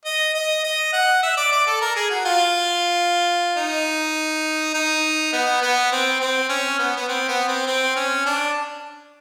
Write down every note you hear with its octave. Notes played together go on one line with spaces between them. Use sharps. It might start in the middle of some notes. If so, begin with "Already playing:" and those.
D#5
D#5
D#5
F#5
E5
D5
D5
A4
A#4
G#4
F#4
F4
D#4
D#4
B3
B3
C4
C4
C#4
B3
B3
C4
B3
C4
C4
C#4
D4